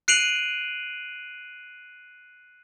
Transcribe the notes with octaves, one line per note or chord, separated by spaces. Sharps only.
F#6 C7 D7 D#7 F7 F#7